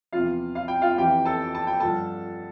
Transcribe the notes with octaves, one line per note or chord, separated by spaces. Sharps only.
E2 C3 F3 F4 F5
F5
G5
F4 F5
F2 E3 G4 G5
A4 A5
A5
G5
G2 D3 F3 A4 A5